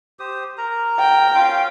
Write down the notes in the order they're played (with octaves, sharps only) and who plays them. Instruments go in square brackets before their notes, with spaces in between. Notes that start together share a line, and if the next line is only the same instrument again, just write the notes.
[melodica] G4 C5 D#6
A#4 A#5
[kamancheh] G5
[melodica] C#4 F4 F5